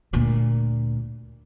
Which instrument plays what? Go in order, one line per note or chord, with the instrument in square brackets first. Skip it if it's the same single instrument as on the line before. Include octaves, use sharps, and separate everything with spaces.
[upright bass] D2 A#2